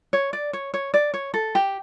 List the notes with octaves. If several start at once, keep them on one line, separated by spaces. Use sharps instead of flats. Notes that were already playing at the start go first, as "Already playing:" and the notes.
C#5
D5
C#5
C#5
D5
C#5
A4
G4